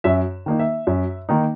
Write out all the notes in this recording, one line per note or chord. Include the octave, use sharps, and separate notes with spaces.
F#2 E5
D#3 A#3 D#4
E5
F#2
D#3 A#3 D#4